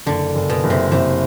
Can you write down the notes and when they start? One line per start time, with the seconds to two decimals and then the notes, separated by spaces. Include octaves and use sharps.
0.06 F#1 D3
0.35 F#1
0.50 B2
0.64 F#1
0.70 C3
0.92 F#1 C3